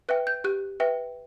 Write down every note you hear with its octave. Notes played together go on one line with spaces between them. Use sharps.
B4 E5 G5 F#6
G6
G4 F#6
B4 E5 G5